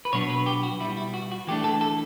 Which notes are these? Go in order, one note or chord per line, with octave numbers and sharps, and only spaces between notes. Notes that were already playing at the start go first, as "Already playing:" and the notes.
B4
B2 F#3 B3 D4 C#5
B4
G4
F#4
B2 G3 B3 E4
E4
F#4
F#4
E3 A3 D4 G4
A4
A4